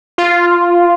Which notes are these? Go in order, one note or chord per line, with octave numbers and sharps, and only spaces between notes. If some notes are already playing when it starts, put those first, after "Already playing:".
F4